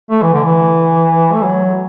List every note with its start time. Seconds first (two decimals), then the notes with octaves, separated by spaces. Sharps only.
0.11 A3
0.22 E3
0.33 D3
0.44 E3
1.33 A3
1.43 F#3